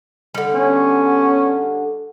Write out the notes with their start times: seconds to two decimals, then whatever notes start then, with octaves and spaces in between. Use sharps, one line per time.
0.34 D3 G3
0.54 B3 C#4